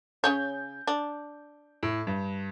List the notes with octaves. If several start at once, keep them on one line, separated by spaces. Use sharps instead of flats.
C#3 C#4 C#5 G6
D4
A2
G2